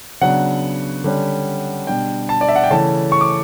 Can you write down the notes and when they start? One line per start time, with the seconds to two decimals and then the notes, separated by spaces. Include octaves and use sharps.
0.21 C#3 F#3 B3 D4 F#5
1.04 D3 G3 C#4
1.87 B2 G3 D4 G5
2.29 A5
2.41 D5
2.49 E5
2.56 F#5
2.64 G5
2.70 C#3 E3 A3 C#4 A5
3.12 C#6
3.21 D6